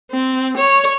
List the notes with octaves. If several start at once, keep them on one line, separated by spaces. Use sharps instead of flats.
C4
C#5